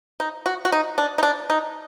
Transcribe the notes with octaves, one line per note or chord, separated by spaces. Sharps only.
D#4
F#4
F#4
D#4
D4
D#4
D4
D#4